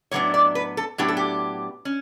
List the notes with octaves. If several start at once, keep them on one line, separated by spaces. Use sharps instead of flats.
A2 F#3 B3 D4 C#5
D5
B4
A4
A2 F#3 B3 D4 G4
A4
G4
C#4